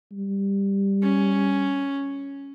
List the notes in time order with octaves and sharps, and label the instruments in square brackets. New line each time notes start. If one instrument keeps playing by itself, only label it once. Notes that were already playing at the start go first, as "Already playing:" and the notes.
[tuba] G3
[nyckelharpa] C#4